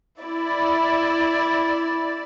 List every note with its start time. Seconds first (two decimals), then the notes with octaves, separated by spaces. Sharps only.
0.21 E4 D5